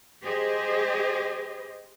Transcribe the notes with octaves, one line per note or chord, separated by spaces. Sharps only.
G4 G#4 C5 D#5